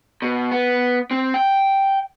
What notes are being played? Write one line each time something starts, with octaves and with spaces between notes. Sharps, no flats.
B2
B3
C4
G5